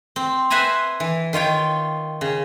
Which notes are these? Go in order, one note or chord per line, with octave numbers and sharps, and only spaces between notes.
C4
B4 C5 E5 F#5 G#5 A#5
E3
D#3 F4 C#5 G5
C#3